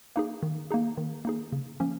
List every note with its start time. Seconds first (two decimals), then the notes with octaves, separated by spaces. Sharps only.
0.16 A#3 D#4 G#4
0.43 D#3
0.71 A#3 D#4 G#4
0.97 D#3
1.25 A#3 D#4 G#4
1.52 C#3
1.80 F3 A#3 C#4